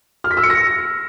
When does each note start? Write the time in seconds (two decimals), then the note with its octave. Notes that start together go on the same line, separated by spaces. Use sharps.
0.24 F6
0.31 B6
0.37 E6
0.43 C#7
0.50 A#6